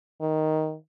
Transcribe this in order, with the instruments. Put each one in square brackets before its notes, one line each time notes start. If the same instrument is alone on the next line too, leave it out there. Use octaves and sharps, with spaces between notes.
[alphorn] D#3